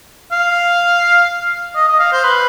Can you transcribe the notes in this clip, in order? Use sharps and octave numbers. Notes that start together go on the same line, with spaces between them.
F5
D#5
D#5
F5
C5
B4